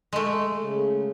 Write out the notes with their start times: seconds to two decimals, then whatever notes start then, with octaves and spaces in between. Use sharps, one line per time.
0.13 G#3 A3
0.59 C#3